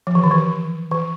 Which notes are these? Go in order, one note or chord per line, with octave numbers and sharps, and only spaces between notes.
F3
E3
D#3
E3
E3